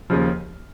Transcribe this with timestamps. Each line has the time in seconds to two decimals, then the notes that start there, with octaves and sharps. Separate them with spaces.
0.10 D#2 C#3 F3